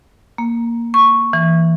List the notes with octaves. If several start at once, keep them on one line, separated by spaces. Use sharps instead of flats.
A#3
C#6
E3